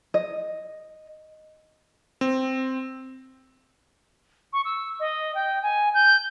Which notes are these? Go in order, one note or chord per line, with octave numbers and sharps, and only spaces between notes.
D#5
C4
C#6
E6
D#5
G5
G#5
G6